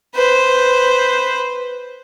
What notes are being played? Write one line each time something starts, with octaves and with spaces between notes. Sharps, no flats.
B4 C5